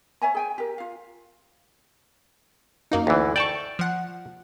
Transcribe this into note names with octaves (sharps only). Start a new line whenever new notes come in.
C#5 E5 G#5 A#5
G#4 G5 G#5
G4 A#4
F4 F5
F#2 A#3 D#4
D2 E3
D5 G5 A5 C#6
F3 F#5